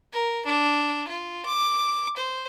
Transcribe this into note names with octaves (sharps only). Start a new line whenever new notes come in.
A#4
D4
F4
D6
C5